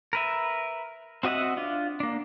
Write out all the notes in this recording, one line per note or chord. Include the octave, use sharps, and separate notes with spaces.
A#4 B4 E5
C4 F#4 D#5 E5 F#5
D4 F4
A#3 D4